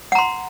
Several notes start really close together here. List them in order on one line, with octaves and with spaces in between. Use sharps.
F#5 A#5 C6